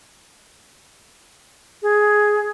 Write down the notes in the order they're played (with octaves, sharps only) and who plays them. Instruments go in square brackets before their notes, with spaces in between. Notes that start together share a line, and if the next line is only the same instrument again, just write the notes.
[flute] G#4